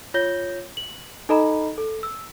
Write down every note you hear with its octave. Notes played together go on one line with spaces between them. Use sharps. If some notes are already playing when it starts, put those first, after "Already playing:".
F4 C#5 G6 A#6 G7
F#7
D#4 A4 D#5 A#5 B5
A4
E6